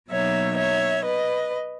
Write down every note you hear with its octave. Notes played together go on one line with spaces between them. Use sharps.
B2 F#3 A#3 D#4 C#5 E5
C#5 E5
B4 D#5